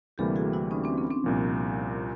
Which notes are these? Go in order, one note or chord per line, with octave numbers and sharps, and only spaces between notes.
D2 C3 E3 G3 A#3 G4 A4
F#4 G#4
E4 F#4
C#4 D#4
C4 D4
B3 C#4
C4 D4
C2 A#2 F3